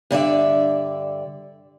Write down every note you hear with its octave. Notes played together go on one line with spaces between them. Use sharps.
G2 D3 D5 E5